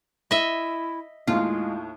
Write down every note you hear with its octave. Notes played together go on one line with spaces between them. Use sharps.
E4 D#5 E5
D#2 A2 G#3 F4